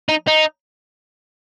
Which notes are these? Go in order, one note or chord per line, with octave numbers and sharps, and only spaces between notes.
D#4
D#4